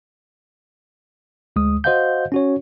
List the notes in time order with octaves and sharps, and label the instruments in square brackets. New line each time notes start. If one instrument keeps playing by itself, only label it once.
[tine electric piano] D2 G#3 D#6
F#4 C5 D#5 F5 F#5 G6
C#4 F#4 C#5